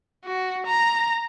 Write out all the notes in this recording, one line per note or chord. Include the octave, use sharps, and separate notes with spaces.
F#4
A#5